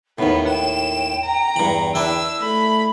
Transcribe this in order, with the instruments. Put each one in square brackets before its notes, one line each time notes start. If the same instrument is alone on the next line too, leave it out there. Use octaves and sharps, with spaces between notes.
[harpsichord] D#2 A2 [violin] B3 [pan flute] D#4
[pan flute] G5 [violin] E7
[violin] A#5
[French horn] E2 [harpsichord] G2 B5
[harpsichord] D4 E4 B4 [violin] E6
[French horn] A3 [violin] B5